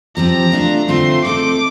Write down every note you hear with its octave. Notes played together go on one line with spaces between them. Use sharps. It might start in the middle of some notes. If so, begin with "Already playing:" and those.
F3 C4 G4 A#5
A3 D4 F4
D3 A3 C4 F4 C6
A3 C4 D#4 A4 D6